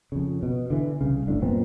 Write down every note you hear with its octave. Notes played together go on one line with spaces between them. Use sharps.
F2 C#3
B2
D3 E3
C2 C#3
G1 C2 A2 D4
F#2 A#2 B3 C4